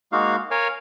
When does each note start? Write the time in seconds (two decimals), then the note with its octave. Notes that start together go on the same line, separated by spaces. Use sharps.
0.12 G#3 A#3 D#4 F#4 F5
0.51 A#4 C#5 F5 G#5